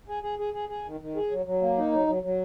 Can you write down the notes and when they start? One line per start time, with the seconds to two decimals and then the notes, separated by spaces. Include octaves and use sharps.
0.08 G#4
0.23 G#4
0.39 G#4
0.54 G#4
0.69 G#4
0.85 D#3
1.00 D#3
1.16 G#4
1.31 F#3
1.46 F#3
1.61 A#3
1.77 D#4
1.92 F#3
2.07 F#3
2.23 F#3